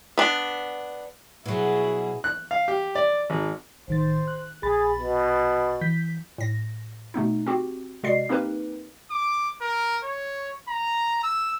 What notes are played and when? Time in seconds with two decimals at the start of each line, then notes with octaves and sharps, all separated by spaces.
0.18 B3 D4
1.45 B2 F#3 E4 G#4
2.24 F#6
2.51 F5
2.68 G4
2.95 D5
3.30 G#1
3.88 A1 D#3 C5 A6
4.28 F#6
4.63 A#1 G#4 B5 A6
4.99 B2
5.81 E3 G6 B6
6.38 A2 A#6
7.14 B2 A3 B3 D#4
7.46 C4 F#4 G4
8.03 C3 G#3 F#4 D5 D#5 C7
8.29 A#3 C4 D#4 G4 A#4 B4
9.11 D6
9.61 A#4
10.03 C#5
10.68 A#5
11.23 E6